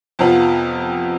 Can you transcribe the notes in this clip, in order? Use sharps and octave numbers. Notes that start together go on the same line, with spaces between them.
F2 C3 F3 B3 F4